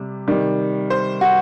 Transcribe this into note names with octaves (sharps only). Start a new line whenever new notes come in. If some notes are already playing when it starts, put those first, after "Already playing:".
Already playing: C3 G3
C3 D#3 G3
C5
F#4